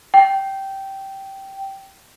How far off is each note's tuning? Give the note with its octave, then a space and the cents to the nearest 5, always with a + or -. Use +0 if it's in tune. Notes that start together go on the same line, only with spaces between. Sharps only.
G5 -15